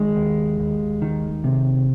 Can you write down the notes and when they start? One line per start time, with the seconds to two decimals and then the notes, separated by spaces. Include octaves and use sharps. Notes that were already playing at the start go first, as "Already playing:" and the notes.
Already playing: D#3 G#3
0.16 D#2
0.59 D#2
1.02 D#3
1.44 C3